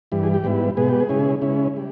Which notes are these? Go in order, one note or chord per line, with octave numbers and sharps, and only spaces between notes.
G2 E3 G3
G#4
G4
G#2 G3 B3 E4
B2 G#3 B3 G#4
G4
G#4
C#3 G#3 C#4 E4
C#3 G#3 C#4 E4
G3